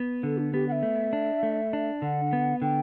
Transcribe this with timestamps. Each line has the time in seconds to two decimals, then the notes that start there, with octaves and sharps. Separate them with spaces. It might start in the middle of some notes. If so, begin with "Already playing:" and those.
Already playing: B3
0.23 D3 A4
0.38 D4
0.53 B3 G4
0.69 F#5
0.72 E5
0.83 A3
1.13 D4
1.43 A3
1.73 D4
2.02 D3 F#5
2.33 B3
2.62 D3 G5